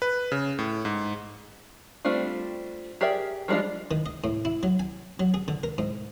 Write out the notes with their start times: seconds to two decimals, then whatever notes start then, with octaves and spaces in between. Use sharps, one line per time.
0.02 B4
0.32 C#3
0.59 A2
0.85 G#2
2.05 G3 A3 C4 D4 F4
3.01 G4 G#4 A#4 D5 E5
3.48 F3 G3 G#3 D4 F4
3.91 D#3
4.06 D#5
4.24 A2
4.45 E4
4.63 F#3
4.80 G#5
5.20 F#3
5.34 G#4
5.48 D3
5.63 A#4
5.78 G#2